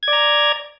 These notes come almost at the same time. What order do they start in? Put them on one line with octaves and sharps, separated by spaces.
G#6 D5 A#5